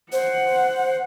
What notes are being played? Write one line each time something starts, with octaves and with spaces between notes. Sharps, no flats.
C5 F#5